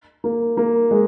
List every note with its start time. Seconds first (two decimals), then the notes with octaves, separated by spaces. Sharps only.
0.24 A#3
0.57 A#3
0.91 G#3